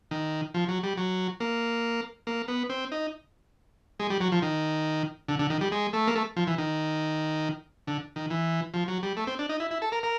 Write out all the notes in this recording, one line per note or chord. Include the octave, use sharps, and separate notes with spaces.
D#3
F3
F#3
G3
F#3
A#3
A#3
B3
C4
D#4
G#3
G3
F#3
F3
D#3
D3
D3
D#3
G3
G#3
A3
A#3
A3
F3
E3
D#3
D3
D#3
E3
F3
F#3
G3
A3
C4
D4
D#4
E4
E4
A4
A#4
A#4